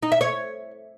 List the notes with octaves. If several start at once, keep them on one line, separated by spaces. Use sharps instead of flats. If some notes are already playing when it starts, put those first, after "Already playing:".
D#4
E5
C#5